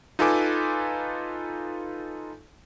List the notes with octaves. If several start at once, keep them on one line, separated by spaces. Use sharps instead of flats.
D#4 F4 A4 B4 G#5 D6